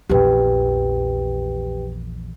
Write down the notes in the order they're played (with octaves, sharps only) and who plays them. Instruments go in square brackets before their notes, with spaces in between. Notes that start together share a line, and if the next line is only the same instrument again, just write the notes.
[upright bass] A#1 E2 [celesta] G4 B4 G5